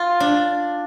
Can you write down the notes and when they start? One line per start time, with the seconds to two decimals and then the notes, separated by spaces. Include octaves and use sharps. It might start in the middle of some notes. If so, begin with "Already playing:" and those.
Already playing: F4
0.20 D4